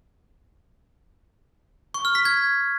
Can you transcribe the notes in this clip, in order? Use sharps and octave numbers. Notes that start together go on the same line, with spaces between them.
C#6
F6
B6
G#6